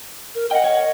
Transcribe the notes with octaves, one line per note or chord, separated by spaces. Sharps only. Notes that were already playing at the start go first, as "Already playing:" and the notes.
A#4
D#5 F#5 G5
C#5